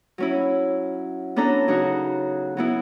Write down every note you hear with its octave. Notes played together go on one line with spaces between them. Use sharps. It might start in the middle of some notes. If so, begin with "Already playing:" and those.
F#3 C#4 E4
B3 C#4 D4 A4 A#5
C#3 F#3 D#4 F#4
F#3 B3 E4